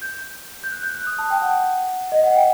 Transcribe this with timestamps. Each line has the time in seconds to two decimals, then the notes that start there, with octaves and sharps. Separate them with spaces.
0.02 G6
0.64 G6
0.72 F#6
0.83 G6
0.95 F#6
1.07 D#6
1.19 A5
1.30 G5
1.42 F#5
2.12 D#5
2.23 F#5
2.36 G5